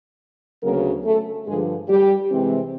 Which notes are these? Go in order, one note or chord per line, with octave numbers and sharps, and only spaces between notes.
D2 C#3 F#3 A#3 B3 A#4
A3 A4
G2 D3 F3 G#3 G#4
G3 G4
C3 E3 G#3 C4